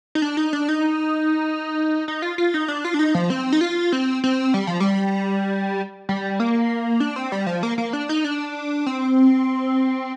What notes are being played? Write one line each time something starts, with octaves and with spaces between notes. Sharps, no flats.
D#4
D4
D#4
D4
D#4
D#4
F4
F4
D#4
D4
F4
D4
D#4
F3
C4
D#4
F4
C4
C4
G3
F3
G3
G3
A#3
D4
C4
G3
F3
A#3
A#3
D4
D#4
D4
C4